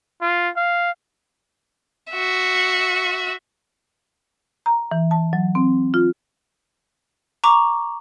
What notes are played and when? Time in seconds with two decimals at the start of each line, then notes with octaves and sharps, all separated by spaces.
0.22 F4
0.57 F5
2.11 F#4 E5
4.66 A#5
4.91 E3
5.11 A5
5.33 F#3
5.55 C4
5.94 F4
7.44 A#5 C#6 D6 F7